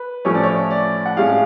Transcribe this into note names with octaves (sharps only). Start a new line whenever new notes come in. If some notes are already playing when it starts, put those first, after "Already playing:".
Already playing: B4
A2 F3 A3 C#4 C#5
D5
C#5
D5
F#5
A2 G#3 C#4 F5